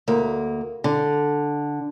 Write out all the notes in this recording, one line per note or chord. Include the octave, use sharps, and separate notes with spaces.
D2 A#3
D3